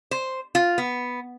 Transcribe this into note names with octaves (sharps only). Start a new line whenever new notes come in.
C5
F4
B3